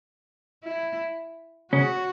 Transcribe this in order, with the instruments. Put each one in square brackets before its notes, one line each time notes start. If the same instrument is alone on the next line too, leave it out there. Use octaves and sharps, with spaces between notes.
[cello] E4
[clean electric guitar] C#3 C#4 [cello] F#4